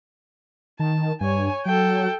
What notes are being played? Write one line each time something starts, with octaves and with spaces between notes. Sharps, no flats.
D#3 A5
G2 C#5 G#5
F#3 A4 G5